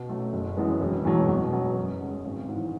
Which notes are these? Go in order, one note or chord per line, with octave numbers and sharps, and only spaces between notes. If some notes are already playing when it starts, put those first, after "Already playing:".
Already playing: B2
F#3 A3
F#1
F#2 E3 G#3 B3
E1
E2 B2 F#3
B2
F#3 B3
F#2
C#3 G#3
G#1
G#2 E3